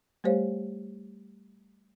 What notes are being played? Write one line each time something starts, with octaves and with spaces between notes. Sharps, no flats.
G3 A3 G4 C5 C#5 F5